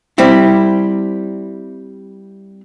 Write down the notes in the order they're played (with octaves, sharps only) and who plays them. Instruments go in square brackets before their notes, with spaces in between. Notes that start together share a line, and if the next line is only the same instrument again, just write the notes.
[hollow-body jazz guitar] G3 C4 E4